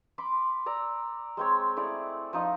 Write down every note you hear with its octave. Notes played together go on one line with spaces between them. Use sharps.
B5 C6 D6
D5 A#5 E6
G#3 C4 C#5
A3 E4 G#4 D5
F3 D#4 D#5